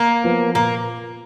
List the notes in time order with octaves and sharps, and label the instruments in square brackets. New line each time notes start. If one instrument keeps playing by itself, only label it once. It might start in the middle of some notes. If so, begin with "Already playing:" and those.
Already playing: [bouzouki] A#3
[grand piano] F3 B3
[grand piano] A#2 [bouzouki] A#3